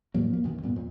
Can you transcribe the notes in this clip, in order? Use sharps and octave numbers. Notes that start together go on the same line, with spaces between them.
E2 A2 F#3 A#3
F3 A#3
B1 F#2 C3 D#3
E2 G2 A#2 B3
F2